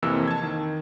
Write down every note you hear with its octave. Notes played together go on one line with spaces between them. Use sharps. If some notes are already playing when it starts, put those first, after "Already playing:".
F2 C3 E3 A#3 G4 E6
A5 G#6
D#3